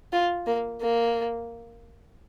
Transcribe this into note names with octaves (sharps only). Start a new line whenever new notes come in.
F4
A#3
A#3